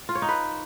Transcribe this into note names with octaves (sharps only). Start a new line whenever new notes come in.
F4
C#5
D#4
B4